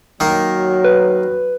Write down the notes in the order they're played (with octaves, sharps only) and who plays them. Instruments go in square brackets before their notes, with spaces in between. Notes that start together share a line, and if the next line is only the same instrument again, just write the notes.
[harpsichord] D#3 A#3 [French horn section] F#3
[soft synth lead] B4